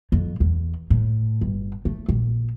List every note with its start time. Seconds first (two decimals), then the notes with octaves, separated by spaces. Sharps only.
0.12 F2
0.40 E2
0.90 A2
1.41 G1
1.85 A3
2.09 A#1